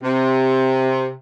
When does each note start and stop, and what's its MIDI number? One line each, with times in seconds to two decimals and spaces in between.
0.03 1.12 48